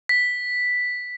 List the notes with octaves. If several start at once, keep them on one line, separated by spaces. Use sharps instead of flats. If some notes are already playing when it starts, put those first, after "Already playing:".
B6